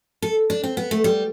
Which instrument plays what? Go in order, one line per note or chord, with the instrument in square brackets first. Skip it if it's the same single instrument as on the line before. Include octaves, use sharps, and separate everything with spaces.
[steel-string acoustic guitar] A4
D4
C4
B3
A3
G3